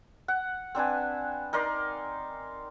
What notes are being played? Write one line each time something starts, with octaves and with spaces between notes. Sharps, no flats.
F#5
C4 D4 B4 G#5
D#4 A#4 D5 C6